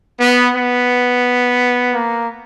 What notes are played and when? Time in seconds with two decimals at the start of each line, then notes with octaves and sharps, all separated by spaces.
0.20 B3
0.55 B3
1.92 A#3